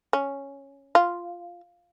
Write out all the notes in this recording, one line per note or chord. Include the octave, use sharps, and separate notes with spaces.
C#4
F4